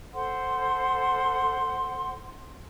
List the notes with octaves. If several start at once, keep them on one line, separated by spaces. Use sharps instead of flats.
A4 C5 F#5 C6